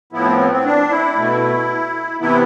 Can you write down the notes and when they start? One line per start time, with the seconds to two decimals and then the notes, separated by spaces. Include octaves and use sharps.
0.13 A2 F3 B3 E4
0.25 C4
0.39 C4
0.52 C4
0.65 D4
0.90 E4
1.17 B2 A3
2.20 C3 E3 B3 E4